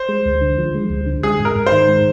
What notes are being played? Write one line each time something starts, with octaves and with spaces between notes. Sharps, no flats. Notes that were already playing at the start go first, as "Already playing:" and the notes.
Already playing: C5
G#3
D2
D3
F3
G#3
D2
D3
G#3 G#4
G#2
A#4
G#2
C5
D#3
G#3